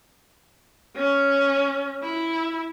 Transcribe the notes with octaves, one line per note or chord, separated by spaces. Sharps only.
C#4
E4